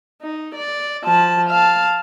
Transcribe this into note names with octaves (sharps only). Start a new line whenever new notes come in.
D#4
D5
F3 A5
F5 A5